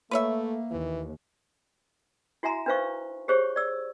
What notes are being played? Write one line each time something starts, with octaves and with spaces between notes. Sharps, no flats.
A3 A#3 B4 C#5 E5
D#2 E3
E4 F#4 E5 G#5 A#5 C6
D4 D#4 B4 C5 F5 C#6
G4 G#4 C5 C#5 C#6
D5 E6